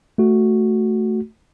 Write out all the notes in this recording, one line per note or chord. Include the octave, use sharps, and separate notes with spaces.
A3 F#4